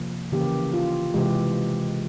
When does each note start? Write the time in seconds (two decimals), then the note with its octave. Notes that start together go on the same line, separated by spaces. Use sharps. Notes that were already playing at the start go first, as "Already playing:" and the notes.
Already playing: C3 F3 A#3
0.32 C#3 E3 A#3 G4
0.74 F4
1.14 C3 E3 G#3 G4